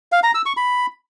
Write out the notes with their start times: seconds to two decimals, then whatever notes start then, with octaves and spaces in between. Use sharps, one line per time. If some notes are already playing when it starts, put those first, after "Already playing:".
0.12 F5
0.23 A#5
0.34 E6
0.46 C#6
0.57 B5